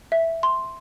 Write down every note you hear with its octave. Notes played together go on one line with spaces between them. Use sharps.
E5
C6